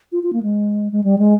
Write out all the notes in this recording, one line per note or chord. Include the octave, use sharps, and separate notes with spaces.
F4
F4
A#3
G#3
G#3
G3
G#3